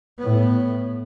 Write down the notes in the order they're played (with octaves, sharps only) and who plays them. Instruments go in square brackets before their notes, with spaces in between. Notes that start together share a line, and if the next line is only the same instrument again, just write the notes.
[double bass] A2 B3